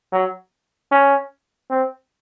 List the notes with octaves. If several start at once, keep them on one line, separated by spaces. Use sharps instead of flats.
F#3
C#4
C4